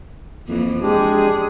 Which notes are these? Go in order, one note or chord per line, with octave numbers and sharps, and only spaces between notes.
F2 E3 A#3
G#3 D4 G4 G#4